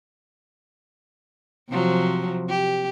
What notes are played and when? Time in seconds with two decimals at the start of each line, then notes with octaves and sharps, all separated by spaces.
1.69 C3 F3 F#3
2.49 G4